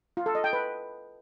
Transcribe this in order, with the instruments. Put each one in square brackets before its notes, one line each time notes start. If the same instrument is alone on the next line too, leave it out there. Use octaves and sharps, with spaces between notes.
[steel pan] F4
A4
D#5
G5
B4